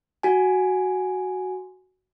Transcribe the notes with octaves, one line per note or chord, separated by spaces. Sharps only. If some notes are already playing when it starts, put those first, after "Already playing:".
F#4 G#5